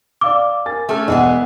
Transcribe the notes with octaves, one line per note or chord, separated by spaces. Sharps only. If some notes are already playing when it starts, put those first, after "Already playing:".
D5 F5 D6 E6
A#4 G#5 A6
A3 C#4 G#4 A5 F6
E1 E3 G#3 B3 D#5 F#5